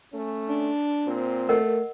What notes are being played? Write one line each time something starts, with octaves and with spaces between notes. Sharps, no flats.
A3 C#4
D4
A#2 C4
A3 A#4 D#5 F#5